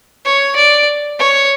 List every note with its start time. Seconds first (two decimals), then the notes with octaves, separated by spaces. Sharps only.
0.25 C#5
0.56 D5
1.19 C#5